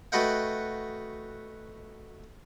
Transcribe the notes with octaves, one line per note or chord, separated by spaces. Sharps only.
A3 F#4 B4 D#5 F#5 G5